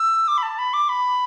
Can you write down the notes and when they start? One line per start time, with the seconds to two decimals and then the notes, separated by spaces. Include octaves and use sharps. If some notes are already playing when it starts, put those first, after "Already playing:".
Already playing: E6
0.28 D6
0.37 B5
0.43 A5
0.58 B5
0.73 D6
0.89 B5